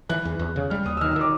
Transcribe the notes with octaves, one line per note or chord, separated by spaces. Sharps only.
E3 F#6
E2
E2
C#3
G3 F6
D#2 D#6
E6
D#3 F6
E6
D#3
D6